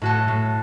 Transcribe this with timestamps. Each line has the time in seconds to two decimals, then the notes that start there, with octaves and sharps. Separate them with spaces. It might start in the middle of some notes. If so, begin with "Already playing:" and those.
0.02 A2 F#4 A4
0.28 A2